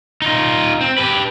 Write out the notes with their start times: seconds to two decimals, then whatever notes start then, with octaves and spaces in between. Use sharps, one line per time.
0.22 D#4 F4
0.81 C4
0.98 G4 B4